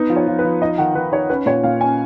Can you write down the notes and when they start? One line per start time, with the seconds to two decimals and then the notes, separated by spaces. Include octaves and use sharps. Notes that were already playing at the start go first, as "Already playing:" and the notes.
Already playing: B3 D#4
0.10 F3
0.16 C#5
0.28 F3
0.39 B4
0.44 F3
0.62 D#4 D#5
0.78 D#3 F#5
0.95 D#3 B4
1.12 D#4 C#5
1.30 C#4 B4
1.46 A#2 C#5
1.63 A#2 F5
1.81 C#4 G#5